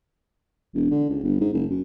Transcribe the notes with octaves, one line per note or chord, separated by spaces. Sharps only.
E1
D3
C#2
G1
G#2
F#1
F#2